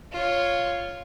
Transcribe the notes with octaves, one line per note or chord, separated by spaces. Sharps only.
F4 C#5